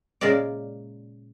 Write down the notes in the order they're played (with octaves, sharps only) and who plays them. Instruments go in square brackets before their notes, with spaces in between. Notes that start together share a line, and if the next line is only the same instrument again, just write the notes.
[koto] A#2 C#3 G#3 A#4 D5